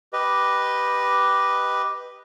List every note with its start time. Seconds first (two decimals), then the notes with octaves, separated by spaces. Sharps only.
0.13 G4 B4 D#5